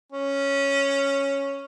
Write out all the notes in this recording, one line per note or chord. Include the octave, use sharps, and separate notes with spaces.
C#4